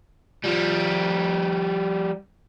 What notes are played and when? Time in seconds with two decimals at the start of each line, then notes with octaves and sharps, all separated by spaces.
0.45 F3 G3